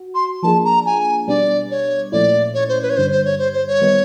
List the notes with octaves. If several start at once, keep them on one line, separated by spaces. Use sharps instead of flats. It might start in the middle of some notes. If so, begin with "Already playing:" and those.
Already playing: F#4
C6
F3 A#3 D4 F4 G#4 A5
A#5
G#5
B2 G3 B3 D4 D5
C#5
A#2 F3 A3 C#4 E4 D5
C#5
C5
B4
C#5
G2 D3 G3 C5
C5
C#5
C5
C5
C#5
D#3 G3 B3 D#4